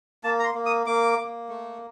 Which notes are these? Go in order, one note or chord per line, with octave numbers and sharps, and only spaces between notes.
A#3 A5
A#5
C6
A#3
D#6
A#3 D6
A#3
A3